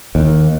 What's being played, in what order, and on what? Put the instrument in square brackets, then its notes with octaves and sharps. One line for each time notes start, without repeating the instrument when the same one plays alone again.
[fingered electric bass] D#2